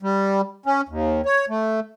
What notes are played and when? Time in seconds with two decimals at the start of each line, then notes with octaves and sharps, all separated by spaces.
0.03 G3
0.66 C#4
0.89 D#2
1.26 C#5
1.49 A3